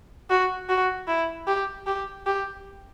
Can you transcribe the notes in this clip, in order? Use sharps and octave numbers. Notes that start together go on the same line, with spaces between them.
F#4
F#4
E4
G4
G4
G4